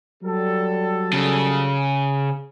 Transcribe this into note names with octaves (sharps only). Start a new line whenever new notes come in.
F#3 G3 A4
C#3